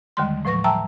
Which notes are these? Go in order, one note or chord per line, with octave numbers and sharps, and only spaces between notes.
D#2 D3 D#3 G3 G#3 C6
A2 F3 F#3 B4 C#6 A#6
E5 G5 A5 A#5 E6